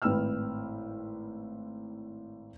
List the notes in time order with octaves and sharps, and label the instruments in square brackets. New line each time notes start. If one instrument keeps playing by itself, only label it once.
[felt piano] G#1 A2 B4 G5 E6 F6